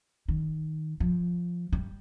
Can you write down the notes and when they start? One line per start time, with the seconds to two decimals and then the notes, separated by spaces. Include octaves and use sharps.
0.28 D#3
1.00 F3
1.72 G3